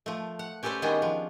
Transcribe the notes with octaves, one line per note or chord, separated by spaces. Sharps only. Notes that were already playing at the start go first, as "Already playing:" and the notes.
F3 A3
F#5
C#4 G4 A4 B4 C5 D5
D#3 G3 G#3 B3 C#4 D4
F3